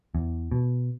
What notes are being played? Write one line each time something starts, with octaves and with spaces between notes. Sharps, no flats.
E2
B2